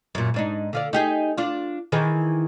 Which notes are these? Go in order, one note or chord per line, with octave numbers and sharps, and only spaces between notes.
F#2 A#2
G#2 D4 D#4
D3 F4 D5
D#4 G4 G#4
D4 F4
D#3 E3 G#4